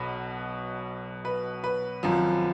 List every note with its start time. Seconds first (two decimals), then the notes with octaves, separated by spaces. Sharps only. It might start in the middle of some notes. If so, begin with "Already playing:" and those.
Already playing: B1 B2 B4
1.25 B4
1.64 B4
2.03 G#1 F#2 F3